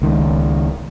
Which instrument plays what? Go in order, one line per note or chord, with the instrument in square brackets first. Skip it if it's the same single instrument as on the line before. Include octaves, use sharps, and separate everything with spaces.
[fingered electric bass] C#2 D#3